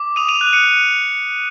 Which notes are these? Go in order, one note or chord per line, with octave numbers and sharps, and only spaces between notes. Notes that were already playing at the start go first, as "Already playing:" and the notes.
Already playing: D6
D#6 D#7 F7
D#7 F7
F#6
C#7 D#7